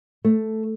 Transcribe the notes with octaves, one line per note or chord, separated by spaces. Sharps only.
A3